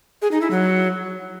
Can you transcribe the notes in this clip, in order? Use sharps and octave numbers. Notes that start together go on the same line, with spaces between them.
G#4
D#4
E4
F#3